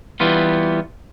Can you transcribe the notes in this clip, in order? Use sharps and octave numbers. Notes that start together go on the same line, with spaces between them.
E3 G3 B3 F4